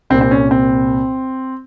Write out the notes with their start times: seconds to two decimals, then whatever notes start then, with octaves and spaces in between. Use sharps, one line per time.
0.10 C2 C4
0.14 A#2
0.21 C4
0.31 C#4
0.51 C4